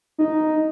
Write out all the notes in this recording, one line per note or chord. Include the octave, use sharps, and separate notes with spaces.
D#4